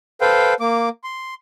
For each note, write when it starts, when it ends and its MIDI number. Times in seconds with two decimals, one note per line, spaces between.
0.21 0.54 69
0.21 0.54 71
0.21 0.54 72
0.21 0.54 77
0.21 0.54 79
0.60 0.89 58
0.60 0.89 86
1.04 1.34 84